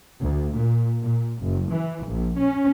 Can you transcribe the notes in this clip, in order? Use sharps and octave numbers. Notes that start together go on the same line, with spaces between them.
D2
A#2
A#2
F#1
E3
A#1
C#4